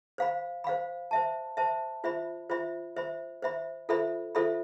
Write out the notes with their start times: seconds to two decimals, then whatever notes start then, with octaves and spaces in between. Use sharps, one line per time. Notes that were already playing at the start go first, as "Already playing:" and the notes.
0.18 C5 F5 B5
0.64 C5 F5 B5
1.11 C5 E5 A5
1.57 C5 E5 A5
2.04 F4 C5 E5 B5
2.50 F4 C5 E5 B5
2.96 C5 E5 B5
3.42 C5 E5 B5
3.89 F4 A4 C5 E5 B5
4.35 F4 A4 C5 E5 B5